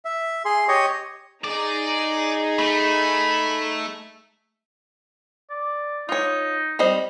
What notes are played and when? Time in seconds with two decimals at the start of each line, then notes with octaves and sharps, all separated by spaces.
0.05 E5
0.45 G#4 C6
0.68 G4 C#5 D#5 C#6 D#6
1.44 D#4 G#4 D5
2.59 A3 B5
5.50 D5
6.09 D#4 F4 C#5
6.79 G3 C4 D#5